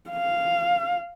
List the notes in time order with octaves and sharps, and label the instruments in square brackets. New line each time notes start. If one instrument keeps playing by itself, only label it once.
[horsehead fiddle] F5